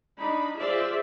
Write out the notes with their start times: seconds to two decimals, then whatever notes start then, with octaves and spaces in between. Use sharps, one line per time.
0.20 D4 D#4 B5
0.59 F4 G#4 C5 D5 E5